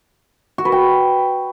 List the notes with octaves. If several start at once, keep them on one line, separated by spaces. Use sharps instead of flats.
F#4
B4
G5